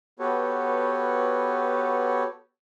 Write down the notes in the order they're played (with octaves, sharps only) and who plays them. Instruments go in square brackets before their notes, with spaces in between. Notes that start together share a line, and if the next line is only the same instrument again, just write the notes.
[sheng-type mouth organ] B3 F#4 G4 A4 B4 C#5